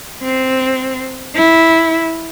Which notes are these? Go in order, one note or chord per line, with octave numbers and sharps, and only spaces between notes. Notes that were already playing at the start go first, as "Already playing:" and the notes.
C4
E4